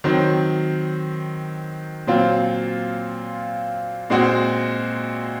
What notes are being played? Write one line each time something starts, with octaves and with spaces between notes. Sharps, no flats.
D#3 F#3 C4
A#2 F#3 C4 F4
A#2 G#3 C4 F#4